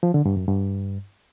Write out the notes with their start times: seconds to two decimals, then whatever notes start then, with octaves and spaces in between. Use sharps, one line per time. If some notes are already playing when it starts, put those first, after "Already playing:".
0.03 F3
0.14 D3
0.25 G2
0.37 F#2
0.48 G2